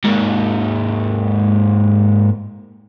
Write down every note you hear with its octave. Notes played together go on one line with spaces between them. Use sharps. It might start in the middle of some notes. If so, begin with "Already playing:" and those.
G#2 A#3